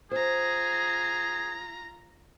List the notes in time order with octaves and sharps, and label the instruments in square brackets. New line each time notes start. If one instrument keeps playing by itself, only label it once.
[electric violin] F4 A#5 [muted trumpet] G#4 [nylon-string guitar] C5